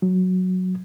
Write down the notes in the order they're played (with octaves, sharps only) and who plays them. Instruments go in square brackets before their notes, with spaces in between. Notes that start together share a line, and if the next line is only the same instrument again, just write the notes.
[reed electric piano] F#3